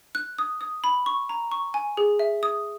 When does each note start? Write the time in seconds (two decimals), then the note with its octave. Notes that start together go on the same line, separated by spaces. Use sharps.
0.15 F#6
0.39 D#6
0.61 D#6
0.84 B5
1.06 C#6
1.29 A#5
1.52 C#6
1.74 G#5
1.97 G#4
2.19 E5
2.43 D#6